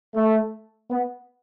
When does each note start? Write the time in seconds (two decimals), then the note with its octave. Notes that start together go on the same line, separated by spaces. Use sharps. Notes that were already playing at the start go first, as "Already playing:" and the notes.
0.15 A3
0.90 B3